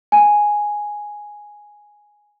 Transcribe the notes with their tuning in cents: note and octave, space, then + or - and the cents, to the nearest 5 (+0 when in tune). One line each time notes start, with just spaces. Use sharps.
G#5 +0